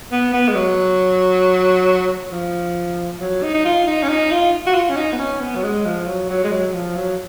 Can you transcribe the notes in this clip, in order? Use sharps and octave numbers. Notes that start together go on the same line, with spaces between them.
B3
B3
G#3
F#3
F3
F#3
D#4
D#4
F4
D#4
C#4
D#4
F4
F#4
F4
C#4
D#4
B3
C#4
B3
F#3
G#3
F3
F#3
F#3
G#3
F#3
F3
F#3